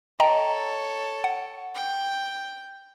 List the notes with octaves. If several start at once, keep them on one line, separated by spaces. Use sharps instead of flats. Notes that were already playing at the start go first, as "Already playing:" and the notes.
A4 C#5 D#5 G5 A#5
F#5
G5